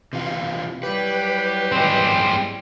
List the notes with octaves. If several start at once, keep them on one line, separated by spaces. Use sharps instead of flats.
C3 E3 F4
F#3 G3 E4 G4 B4
G#3 C4